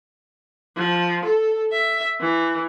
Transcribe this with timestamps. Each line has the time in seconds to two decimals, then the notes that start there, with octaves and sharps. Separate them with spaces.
0.76 F3
1.25 A4
1.72 E5
2.20 E3